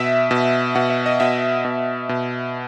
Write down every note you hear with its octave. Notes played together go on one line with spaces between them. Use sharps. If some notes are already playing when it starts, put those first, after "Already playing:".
Already playing: B2 E5
B2
B2 F#5
E5
D#5
B2 E5
B2
B2